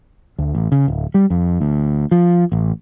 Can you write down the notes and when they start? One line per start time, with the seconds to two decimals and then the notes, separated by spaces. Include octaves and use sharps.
0.39 D2
0.55 A1
0.72 C#3
0.88 D1
1.14 G3
1.30 F2
1.60 D2
2.11 F3
2.52 A1